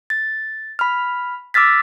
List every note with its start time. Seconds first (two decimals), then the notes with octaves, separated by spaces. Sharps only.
0.10 A6
0.79 B5 F6
1.54 D6 E6 F6 A6 B6